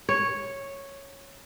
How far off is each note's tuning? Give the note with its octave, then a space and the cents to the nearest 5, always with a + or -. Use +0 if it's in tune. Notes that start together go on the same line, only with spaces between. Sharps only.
C#5 -5